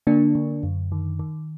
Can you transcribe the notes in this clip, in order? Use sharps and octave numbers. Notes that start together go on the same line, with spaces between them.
D3 A#3 D4
D3
F#2
D#3
D#3